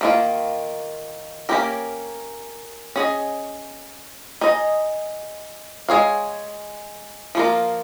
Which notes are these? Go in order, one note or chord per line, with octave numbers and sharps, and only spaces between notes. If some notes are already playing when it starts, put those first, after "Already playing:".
D#3 A#3 F4
A#3 C#4 G4 A#4
C#4 G#4 D#5
D#4 G#4 D#5
G#3 D#4 G#4 C#5 F5
F3 A#3 F4 A#4